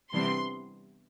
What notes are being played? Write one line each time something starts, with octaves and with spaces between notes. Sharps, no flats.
C3 E3 G3 B3 D4 C6